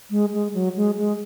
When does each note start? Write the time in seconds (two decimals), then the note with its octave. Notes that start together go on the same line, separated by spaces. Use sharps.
0.10 G#3
0.33 G#3
0.54 F#3
0.76 G#3
0.98 G#3